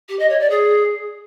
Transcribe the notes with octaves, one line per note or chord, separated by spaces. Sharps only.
G4
D#5
C#5
D5
G#4